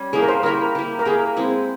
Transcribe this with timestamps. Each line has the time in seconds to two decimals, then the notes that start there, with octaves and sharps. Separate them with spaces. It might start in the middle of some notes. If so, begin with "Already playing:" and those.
Already playing: G3 C#4
0.13 A#3 E4 G4 G#4
0.22 A#4
0.29 C5
0.43 A#3 E4 G4 A#4
0.75 A#3 E4 G4
0.99 A#4
1.05 A#3 E4 G4 G#4
1.37 G#3 C4 E4